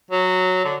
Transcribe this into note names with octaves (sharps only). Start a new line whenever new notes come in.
F#3
D3